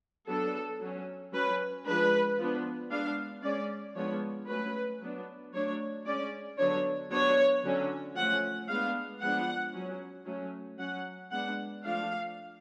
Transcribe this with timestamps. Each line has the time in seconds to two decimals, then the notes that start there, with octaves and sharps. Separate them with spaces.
0.27 F#3 B3 D4 A4
0.80 F#3 C#4
1.32 F#3 C#4 B4
1.85 F3 G#3 D4 B4
2.37 F3 B3 D4
2.90 G#3 B3 D4 F5
3.42 G#3 C#4 D5
3.95 F3 G#3 B3 D4 C#5
4.48 F#3 A3 C#4 B4
5.00 F#3 B3 D4
5.53 F#3 A3 D4 C#5
6.05 G#3 C#4 D5
6.57 D3 F#3 B3 D4 C#5
7.10 F#3 B3 D4 C#5
7.63 D3 F#3 C#4
8.15 F3 A3 C#4 F#5
8.68 G#3 B3 D4 F5
9.20 F3 G#3 B3 D4 F#5
9.73 F#3 C#4
10.25 F#3 A3 C#4
10.78 F#3 C#4 F#5
11.31 G#3 B3 D4 F#5
11.83 F3 A3 D4 F5